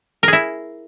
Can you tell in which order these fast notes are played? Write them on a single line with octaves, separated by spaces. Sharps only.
A#4 G#4 E4